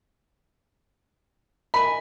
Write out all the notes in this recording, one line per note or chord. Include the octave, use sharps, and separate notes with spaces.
A#4 D#5 G#5 B5